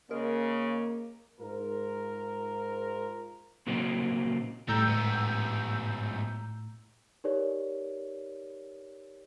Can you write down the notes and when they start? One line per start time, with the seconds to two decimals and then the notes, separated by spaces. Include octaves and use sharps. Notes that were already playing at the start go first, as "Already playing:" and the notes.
0.11 C#3 G#3 A#3 A#4
1.39 G#2 F4 A#4
3.67 A#2 C#3 F#3 A#3 C4 D#4
4.69 A2 G3 A3 A#5 E6 G6
4.87 G#2 B3
7.24 D#4 G4 A#4 B4 C#5 D5